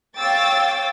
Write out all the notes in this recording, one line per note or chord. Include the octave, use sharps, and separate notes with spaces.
C#5 F5 G5 D6 E6 A6